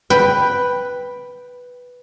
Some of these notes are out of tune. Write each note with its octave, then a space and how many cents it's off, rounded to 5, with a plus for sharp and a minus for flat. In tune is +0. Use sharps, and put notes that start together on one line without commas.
B4 +0 G5 +0